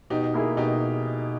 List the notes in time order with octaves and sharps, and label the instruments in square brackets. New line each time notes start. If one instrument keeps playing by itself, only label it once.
[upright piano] B2 [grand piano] D#4 G4
[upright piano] A#3 E4 G#4
[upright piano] B2 [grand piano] D#4 G4